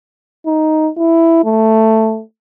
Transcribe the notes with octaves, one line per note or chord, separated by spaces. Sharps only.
D#4
E4
A3